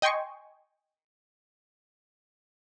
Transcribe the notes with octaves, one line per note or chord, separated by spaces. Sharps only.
D#5 G5 G#5 C6 C#6